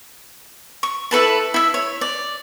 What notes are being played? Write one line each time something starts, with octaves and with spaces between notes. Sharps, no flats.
C#6
E4 A4 B4 A5
E4 E5
C#5
D5